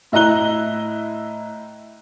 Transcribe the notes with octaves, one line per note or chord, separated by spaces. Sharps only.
A2 E4 D#5 A#5 F#6 G7